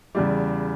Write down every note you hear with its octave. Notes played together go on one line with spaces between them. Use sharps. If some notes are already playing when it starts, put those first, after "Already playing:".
E2 C#3 G3 D5